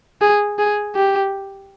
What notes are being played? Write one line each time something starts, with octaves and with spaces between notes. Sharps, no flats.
G#4
G#4
G4